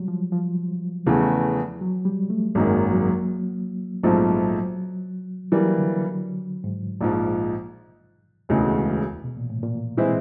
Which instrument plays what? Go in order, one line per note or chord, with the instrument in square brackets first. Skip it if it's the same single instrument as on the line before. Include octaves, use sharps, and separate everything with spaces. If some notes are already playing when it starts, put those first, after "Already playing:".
Already playing: [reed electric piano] F#3 G3
F3
F3
[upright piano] E2 C#3 E3 A3
[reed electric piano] F#3
G3
A3
[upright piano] G#1 F#2 D#3 G#3 [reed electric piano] A#3
[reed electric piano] F#3
[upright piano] A#1 G#2 F3 A3 C4 [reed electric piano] F#3
[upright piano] E3 G3 A#3 [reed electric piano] F#3
[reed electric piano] D3
G#2
[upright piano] A#1 G#2 F3
E1 D2 C#3 E3 G#3
[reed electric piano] B2
A#2
A2
A#2
[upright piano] E3 G#3 C4 E4